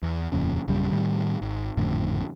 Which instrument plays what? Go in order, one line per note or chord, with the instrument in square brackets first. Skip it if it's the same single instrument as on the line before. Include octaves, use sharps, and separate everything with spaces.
[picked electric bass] E2
D#1 F2 A#2 C#3
A#1 F#2 C#3 G3
A2 D#3 G3
G#1
G#1 F2 A2 D3